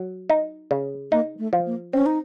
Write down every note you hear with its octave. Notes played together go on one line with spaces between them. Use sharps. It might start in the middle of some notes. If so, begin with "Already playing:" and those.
Already playing: F#3
D#4
C#3
A#3 D#4
A3
F3
A#3
C4 C#4
D#4